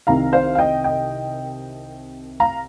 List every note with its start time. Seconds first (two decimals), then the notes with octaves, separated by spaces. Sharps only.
0.07 C2 C3 D#3 F5 A#5
0.33 C5 F5
0.55 F5
0.59 D#5 G5
0.84 D#5 G5
2.40 F5 A#5